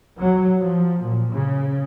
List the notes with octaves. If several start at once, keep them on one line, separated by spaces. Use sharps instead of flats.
F#3
F3
A#2
C#3